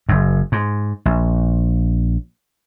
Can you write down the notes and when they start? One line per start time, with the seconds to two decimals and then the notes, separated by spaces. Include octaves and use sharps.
0.09 F#1 F#2
0.52 G#2
1.06 A#1